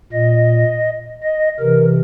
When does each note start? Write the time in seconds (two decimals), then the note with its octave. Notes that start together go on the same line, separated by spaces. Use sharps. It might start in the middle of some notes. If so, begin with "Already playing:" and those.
0.12 A#2 D#5
1.23 D#5
1.59 C3 E3 A#4